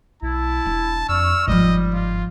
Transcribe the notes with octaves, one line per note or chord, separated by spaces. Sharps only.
B1 E4 A5
E1 D4
F2 D5 C#6 E6 F6
G1 G#2 F3 G3 D#5
F4